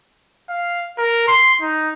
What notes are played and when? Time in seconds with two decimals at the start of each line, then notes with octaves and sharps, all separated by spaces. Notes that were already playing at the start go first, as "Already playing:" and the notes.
0.49 F5
0.98 A#4
1.28 C6
1.61 D#4